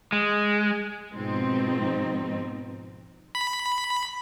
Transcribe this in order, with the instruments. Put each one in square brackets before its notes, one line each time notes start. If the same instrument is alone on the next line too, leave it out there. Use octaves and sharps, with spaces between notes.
[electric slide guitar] G#3
[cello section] G#2 B2 F3 C4 D#4
[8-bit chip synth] B5